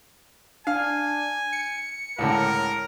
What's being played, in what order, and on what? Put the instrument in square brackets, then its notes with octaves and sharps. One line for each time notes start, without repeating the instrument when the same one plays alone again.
[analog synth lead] D4 [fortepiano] F5 [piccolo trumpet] G#5
[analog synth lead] C#7
[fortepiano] C#2 A2 D3 [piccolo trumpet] A#4